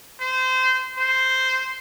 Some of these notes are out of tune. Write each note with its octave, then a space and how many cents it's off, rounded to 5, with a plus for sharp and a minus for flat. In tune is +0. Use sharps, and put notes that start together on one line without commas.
C5 -25
C5 -5